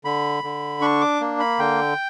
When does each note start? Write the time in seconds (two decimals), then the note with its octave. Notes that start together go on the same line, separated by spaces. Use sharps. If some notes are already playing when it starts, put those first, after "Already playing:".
0.04 D3 B5
0.44 D3
0.82 D4 C#6
1.01 D6
1.21 A#3
1.40 B5
1.59 D3 G5